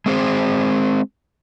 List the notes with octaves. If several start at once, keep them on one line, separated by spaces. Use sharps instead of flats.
G#3 C4 G#4 C5